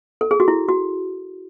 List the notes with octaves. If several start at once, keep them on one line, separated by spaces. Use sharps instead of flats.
A4
G#4
F#4
E4
F#4